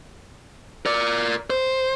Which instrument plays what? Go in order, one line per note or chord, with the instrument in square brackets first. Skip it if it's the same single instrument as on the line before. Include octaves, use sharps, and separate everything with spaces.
[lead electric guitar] A#4 D5
C5